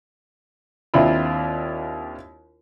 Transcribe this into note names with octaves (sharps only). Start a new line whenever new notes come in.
D#2 C4 D4 E4 F4 B5